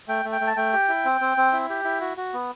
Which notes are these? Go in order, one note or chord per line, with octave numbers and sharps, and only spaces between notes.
A3 G5
A3
G5
A3
A5
A3 G5
G4
E4
C4
C4
C4
E4
G4
E4
F#4
F#4
B3